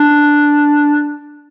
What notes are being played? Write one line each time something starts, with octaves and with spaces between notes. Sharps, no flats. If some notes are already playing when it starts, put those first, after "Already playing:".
Already playing: D4